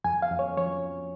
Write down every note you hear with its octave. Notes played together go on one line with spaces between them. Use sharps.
F2 G#5
F5
F2
C#5
F3 C#5